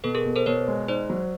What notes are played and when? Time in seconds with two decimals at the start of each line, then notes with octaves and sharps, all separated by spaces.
0.04 B2 A4 B4
0.15 G#4 A#4
0.25 B2
0.36 A#4 C5
0.46 B2 B4 C#5
0.68 G#3
0.88 D#4 C5 D5
1.10 F#3